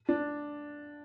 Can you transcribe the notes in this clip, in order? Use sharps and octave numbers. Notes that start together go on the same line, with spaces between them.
D4